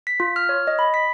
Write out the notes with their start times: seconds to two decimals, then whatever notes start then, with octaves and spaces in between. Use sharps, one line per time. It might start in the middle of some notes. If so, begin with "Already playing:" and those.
0.07 B6
0.20 F4
0.36 F6
0.49 C#5
0.67 D#5
0.79 B5
0.94 B6